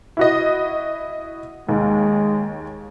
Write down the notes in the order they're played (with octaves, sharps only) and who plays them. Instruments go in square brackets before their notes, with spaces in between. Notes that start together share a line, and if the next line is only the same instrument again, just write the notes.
[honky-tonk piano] E4 F#4 D#5
[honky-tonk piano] D#2 [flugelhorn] G#3